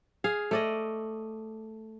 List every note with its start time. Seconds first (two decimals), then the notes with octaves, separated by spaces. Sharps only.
0.24 G#4 F5
0.51 A3 D5 D#5